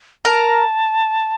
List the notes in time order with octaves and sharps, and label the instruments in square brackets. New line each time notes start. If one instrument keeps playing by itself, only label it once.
[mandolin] A#4 A#5 [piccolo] A5